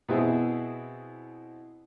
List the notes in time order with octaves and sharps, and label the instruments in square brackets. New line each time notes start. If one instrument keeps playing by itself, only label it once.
[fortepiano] B2 B3 C4 E4 G#4